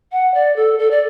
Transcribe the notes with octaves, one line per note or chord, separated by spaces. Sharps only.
F#5
D5
A4
A4
D5